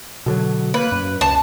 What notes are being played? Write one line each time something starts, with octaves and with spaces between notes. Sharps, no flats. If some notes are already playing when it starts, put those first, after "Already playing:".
B2 D3 F#3
A#3 B4
F#2
C#2 A5